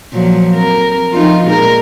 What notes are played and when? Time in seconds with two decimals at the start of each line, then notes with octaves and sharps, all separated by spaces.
0.12 A#2 F3 F#3
0.54 F2 A#4
1.13 F3 D#4 F4
1.46 A#2 G#3 A#4